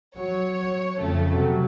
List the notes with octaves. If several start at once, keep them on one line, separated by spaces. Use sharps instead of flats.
F#3 C#5
F2 C#3 A3
C3 F#3